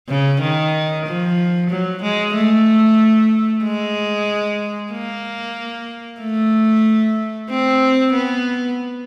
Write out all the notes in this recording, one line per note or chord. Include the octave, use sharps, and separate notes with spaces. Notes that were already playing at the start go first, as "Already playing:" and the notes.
C#3
D#3
F3
F#3
G#3
A3
G#3
A#3
A3
C4
B3